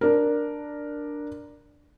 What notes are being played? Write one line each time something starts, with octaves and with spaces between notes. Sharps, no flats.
D4 A#4